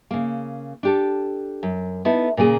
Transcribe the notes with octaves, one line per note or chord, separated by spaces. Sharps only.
C#3 A#3
D4 G4 A4
F#2
B3 D#4 E4 A4
A#2 C#3 A#3 G#4